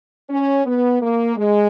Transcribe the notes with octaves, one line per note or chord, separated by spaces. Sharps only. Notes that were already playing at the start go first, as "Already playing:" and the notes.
C#4
B3
A#3
G#3